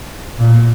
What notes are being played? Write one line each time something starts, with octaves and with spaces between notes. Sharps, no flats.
A#2